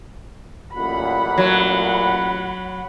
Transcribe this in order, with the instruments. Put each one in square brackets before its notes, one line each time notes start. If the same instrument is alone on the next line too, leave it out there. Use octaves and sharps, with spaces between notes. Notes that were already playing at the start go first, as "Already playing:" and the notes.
[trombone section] A1 F#2 A#2 [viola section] F#5 B5
[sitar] F#3